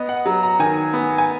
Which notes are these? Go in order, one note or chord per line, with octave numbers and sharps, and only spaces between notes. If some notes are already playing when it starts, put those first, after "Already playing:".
Already playing: B3 D#5
F#5
F#3 A#5
A#5
D#3 G#5
B3
G#5